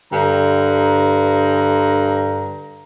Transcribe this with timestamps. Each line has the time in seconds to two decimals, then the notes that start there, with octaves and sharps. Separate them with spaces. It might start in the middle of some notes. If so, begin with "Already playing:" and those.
0.12 G2 D3 A#5